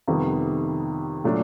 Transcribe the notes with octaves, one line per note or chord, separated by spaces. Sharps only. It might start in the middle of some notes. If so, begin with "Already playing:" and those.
F2 C3 D#3 G3 B3
A#2 F#3 A3 D4